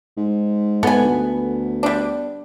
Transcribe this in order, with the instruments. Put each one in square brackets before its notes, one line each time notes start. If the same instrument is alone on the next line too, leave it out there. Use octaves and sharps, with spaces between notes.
[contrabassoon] G#2
[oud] B3 [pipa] A4 G#5
[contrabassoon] D2
[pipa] G3 D4